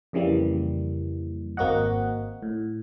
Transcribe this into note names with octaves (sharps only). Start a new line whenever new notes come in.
F2 C#3 E3 G3 A#3
G#1 A#3 C4 F#4 D#5 F#5
A2